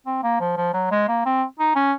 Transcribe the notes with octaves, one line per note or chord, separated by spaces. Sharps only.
C4
A#3
F3
F3
F#3
G#3
A#3
C4
D#4
C#4